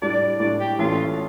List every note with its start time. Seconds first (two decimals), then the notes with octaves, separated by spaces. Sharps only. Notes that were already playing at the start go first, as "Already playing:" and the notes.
0.02 A2 G3 D4 D5
0.40 A2 G3 D4 D5
0.60 G4
0.79 A1 A2 A3 F4